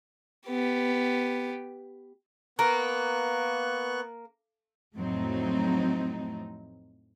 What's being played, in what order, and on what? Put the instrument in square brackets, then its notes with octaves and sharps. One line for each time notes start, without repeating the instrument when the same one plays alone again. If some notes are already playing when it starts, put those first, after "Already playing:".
[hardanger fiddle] B3 G4
[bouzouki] A#3 [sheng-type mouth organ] B3 C#6 F#6
[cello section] F2 A2 F#3 A3 C4 D#4